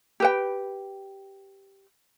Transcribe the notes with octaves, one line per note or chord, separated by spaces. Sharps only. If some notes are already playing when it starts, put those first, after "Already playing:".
G4 B4 G5